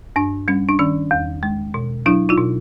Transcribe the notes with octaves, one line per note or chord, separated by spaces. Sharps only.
G2 D4
G3 C#4
D4
D#3 C#4
E2
G#3
B2
F#3 D4 E4
D#4 F4
B2